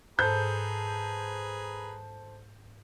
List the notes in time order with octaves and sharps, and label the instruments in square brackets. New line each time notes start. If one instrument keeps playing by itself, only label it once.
[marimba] G#2 [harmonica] G#4 B4 A#5 [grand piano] A4 C5 [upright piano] G6